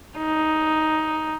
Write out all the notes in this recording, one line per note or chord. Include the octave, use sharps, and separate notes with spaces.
D#4